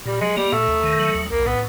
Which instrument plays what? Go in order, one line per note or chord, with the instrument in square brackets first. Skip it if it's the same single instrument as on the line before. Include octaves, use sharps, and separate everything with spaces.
[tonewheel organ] A#2 [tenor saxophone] G3
[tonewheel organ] F#3 [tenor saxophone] G#3
[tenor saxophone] G3 [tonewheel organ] A#3
[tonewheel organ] A#2 [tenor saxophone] A3
[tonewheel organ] D#2
D#3
F#3
D#2
[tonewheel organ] B1 [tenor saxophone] A#3
[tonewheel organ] A2 [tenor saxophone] B3